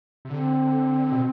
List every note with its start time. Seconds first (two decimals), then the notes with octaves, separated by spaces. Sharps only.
0.25 C3
0.30 D3 C4
1.12 B2